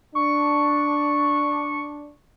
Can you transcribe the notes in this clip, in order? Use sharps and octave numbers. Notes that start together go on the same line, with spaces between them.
D4 C#6